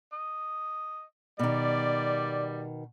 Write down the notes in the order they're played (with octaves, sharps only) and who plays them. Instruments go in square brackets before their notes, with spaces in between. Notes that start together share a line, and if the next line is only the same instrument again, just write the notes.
[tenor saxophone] D#5
[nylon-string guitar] B2 D#3 [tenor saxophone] G3 [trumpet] D5